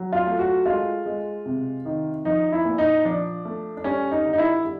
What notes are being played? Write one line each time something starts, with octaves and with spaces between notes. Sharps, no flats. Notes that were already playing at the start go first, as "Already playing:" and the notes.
Already playing: F#3
F4
A3
F#4
G#3 F4
G#3
C3
D#3
F3 D#4
E4
A#2
D#4
F3 D4
A3
D4
G3 C#4
D#4
D3
D#4
E4
G3